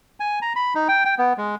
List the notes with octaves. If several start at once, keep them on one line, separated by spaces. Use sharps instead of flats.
G#5
A#5
B5
D#4
G5
G5
B3
G#3